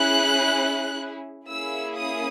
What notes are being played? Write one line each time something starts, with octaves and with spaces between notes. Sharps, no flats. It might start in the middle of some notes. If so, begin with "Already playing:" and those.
Already playing: C#4 E4 G#4 F#6
A#3 C#4 E4 G#4 E6
D#6